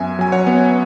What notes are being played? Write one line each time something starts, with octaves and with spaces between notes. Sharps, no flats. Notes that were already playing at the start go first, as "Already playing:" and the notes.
Already playing: F#2 B3 E5 G#5
F#3 G#5
C#5 F#5
B3